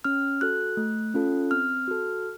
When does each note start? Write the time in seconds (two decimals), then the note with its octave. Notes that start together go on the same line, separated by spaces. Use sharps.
0.04 C#4 F6
0.41 F#4 A4 F#6
0.77 A3
1.14 C#4 F4 A4
1.51 C4 F6
1.88 F#4 A4